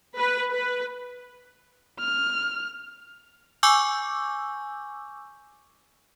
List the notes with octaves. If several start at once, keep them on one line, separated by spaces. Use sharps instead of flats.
B4
B4
F6
G#5 C#6 D6 E6 G6